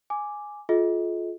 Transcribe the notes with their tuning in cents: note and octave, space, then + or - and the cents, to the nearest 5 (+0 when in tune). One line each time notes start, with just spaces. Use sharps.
G#5 +0 D6 +0
F4 +10 G#4 +45 D#5 +30